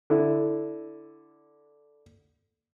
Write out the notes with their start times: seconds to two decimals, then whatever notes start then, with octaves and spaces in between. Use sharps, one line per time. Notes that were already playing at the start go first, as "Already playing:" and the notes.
0.10 D3 E4